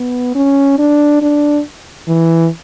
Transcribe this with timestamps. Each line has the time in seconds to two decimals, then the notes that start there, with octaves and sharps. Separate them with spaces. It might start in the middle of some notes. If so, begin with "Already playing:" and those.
Already playing: B3
0.35 C#4
0.78 D4
1.22 D4
2.08 E3